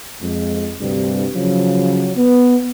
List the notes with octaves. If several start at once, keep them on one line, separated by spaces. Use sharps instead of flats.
F2 G#3
D2 G2 C3 G3
C#3 F3 F#3
B3